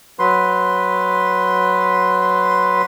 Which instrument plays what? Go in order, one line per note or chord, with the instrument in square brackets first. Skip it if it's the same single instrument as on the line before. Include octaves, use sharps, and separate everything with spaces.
[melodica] F#3 B4 C6